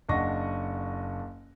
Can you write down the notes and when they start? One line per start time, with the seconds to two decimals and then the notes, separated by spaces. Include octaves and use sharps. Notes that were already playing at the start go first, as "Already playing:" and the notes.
0.09 F#1 D4 D#5 F#5 C#6 A#6